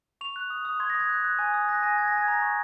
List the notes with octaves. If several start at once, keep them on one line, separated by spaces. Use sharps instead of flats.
C#6 F7
F#6
D#6
D#6
C6 G#6
A#6
D#6
G#6
F#6
F#6
G#5
D#6
F#6 A#6
G#5 A#6
G#5 G#6
A#6
G#5
G#6
A#5 A#6
C#6